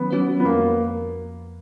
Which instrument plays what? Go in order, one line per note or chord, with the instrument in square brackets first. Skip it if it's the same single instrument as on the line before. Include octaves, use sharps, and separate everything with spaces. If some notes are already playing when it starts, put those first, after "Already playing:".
Already playing: [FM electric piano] D#3 F#3 C#4 B4 [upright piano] B3
[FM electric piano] F#3 C#4 F#4 B4
[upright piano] B3
[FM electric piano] F2 [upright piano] A#3